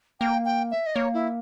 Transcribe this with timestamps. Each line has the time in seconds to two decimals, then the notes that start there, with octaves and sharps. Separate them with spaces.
0.20 A#3 G5
0.45 G5
0.71 E5
0.86 D#5
0.95 A#3 C#5
1.14 E4